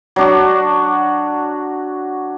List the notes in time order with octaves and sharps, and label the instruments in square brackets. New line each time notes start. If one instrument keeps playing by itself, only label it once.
[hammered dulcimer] F#3 D4 F#4